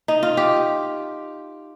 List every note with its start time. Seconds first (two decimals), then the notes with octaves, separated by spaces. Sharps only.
0.08 D#4
0.23 F4
0.37 G4